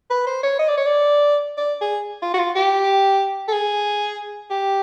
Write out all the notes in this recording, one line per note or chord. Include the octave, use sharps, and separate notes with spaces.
B4
C5
C#5
D#5
D5
C#5
D5
D5
G#4
F4
F#4
F4
G4
A4
G#4
G4